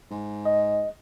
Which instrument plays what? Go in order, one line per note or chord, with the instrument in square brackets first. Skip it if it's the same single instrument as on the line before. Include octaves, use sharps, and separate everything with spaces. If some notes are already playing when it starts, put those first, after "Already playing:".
[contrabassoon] G#2
[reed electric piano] D#5